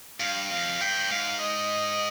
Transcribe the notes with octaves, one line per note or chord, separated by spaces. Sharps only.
G2 F5
F2 F5
G2 G5
G#2 F5
D#5